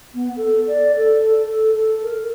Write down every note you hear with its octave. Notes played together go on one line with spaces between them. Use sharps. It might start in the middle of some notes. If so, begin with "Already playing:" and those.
B3
A4
D5
A4
A4
A4
A#4